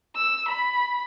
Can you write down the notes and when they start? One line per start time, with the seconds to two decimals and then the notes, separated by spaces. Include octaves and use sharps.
0.17 E6
0.49 B5